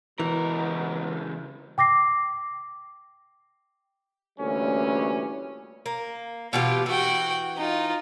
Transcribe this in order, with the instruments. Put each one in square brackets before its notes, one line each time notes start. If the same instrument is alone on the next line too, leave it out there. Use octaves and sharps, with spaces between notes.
[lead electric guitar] C#2 A#4 [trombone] B2 [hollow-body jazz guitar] E3
[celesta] G5 D6 A#6 C7
[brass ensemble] D2 A#2 E3 G3 C#4
[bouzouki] A#3
[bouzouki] B2 E3 G4 [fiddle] F4
[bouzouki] E3 [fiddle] F#4 G5
[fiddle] D#4 F4